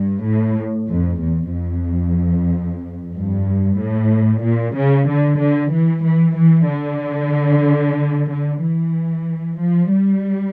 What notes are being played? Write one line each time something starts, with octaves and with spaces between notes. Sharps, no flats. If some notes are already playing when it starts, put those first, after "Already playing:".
Already playing: G2
A2
F2
E2
F2
G2
A2
A#2
C#3
D3
D3
E3
E3
E3
D3
D3
E3
F3
G3